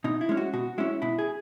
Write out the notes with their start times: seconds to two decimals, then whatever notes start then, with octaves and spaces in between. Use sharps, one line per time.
0.04 B2 D#4
0.21 E4
0.29 G#3 C#4
0.37 F#4
0.53 B2 F#4
0.78 G#3 C#4 E4
1.02 B2 E4
1.19 G#4